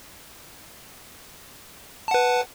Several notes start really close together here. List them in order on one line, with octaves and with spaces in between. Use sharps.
A5 F#5 B4